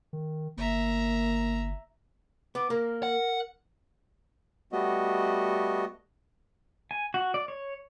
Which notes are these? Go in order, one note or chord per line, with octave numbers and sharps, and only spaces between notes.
D#3
G1 A#3 E5 A#5
B3 D6
A#3 A#4
F#5
G3 A3 B3 F#4 D#5
G#5
F#4
D5
C#5